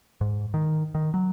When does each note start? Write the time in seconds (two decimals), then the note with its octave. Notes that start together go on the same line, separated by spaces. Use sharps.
0.21 G#2
0.54 D#3
0.95 D#3
1.14 F#3